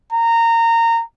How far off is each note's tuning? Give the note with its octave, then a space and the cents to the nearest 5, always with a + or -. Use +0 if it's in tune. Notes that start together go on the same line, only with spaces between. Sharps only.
A#5 -20